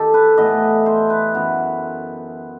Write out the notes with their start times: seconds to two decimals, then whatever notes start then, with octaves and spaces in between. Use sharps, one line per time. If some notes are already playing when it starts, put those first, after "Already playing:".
Already playing: D#3 G4 A4
0.14 B4
0.37 A2 E3 B3 D#5
0.86 C5
1.10 B4
1.35 F#2 E3 B3